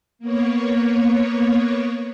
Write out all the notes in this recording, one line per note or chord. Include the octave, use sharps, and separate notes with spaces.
A#3 B3 C#5